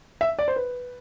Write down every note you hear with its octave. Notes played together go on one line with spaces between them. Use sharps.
E5
D5
C5
B4